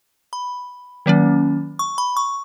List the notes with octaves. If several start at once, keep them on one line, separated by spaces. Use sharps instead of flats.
B5
D#3 F#3 A#3 C#4
C#6
B5
C#6